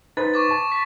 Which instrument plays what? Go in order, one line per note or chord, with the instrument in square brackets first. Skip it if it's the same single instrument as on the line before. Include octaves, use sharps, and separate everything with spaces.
[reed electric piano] D#4 B4 C5 [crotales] A6
[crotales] C#6 D6 A6
[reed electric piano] A5
[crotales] B6